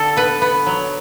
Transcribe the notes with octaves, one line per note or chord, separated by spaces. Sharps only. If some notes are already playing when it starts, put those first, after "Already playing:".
Already playing: D3 A4
B3 B4
B3
F#3